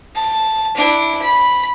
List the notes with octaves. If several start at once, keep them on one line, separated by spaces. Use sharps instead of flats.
A5
D4 E4
B5